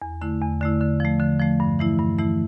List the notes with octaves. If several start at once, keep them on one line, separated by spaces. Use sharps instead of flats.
E2
D3 A3 E4
E2
D3 A3 E4
D3
F3 A3
D3
F3 A3
G2
E3 A3 E4
G2
E3 A3 E4